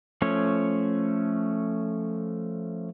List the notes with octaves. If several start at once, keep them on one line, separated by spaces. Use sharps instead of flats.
F3 A3 C#4 C#5